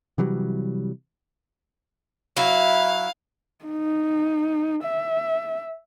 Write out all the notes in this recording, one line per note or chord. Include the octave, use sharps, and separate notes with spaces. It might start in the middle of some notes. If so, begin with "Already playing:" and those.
C3 E3 F#3 G3
F#3 E4 F5
D#4
E5